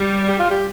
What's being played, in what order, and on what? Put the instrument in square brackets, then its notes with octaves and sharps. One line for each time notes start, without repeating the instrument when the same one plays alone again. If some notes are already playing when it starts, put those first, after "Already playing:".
Already playing: [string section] G3
[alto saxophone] G4
F4
G4